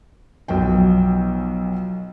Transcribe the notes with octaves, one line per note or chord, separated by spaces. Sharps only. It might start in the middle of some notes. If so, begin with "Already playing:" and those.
B1 F3 F#3 G5